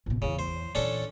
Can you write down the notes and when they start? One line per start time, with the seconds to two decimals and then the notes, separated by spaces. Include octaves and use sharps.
0.06 A1 B2
0.22 E2 C#3 E3
0.39 C5
0.75 A#2 E3 C#4 D4 A4